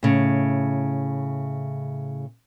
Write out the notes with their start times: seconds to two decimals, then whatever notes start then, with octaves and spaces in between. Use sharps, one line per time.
0.03 A2 C#3